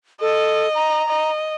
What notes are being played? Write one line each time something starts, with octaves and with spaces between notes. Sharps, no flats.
A4 D#5
A#5
D#5